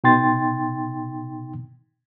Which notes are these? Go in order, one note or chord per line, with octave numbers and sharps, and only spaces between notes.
B2 D#4 G5 C6 A6